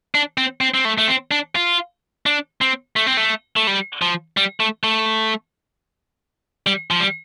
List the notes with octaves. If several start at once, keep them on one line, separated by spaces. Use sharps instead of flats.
D4
C4
C4
C4
A3
A3
C4
D4
F4
D4
C4
A3
C4
A3
A3
G3
F3
G3
A3
A3
G3
F3
G3